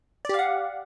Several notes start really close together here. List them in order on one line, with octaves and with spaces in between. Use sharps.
D5 G4 F5 F#5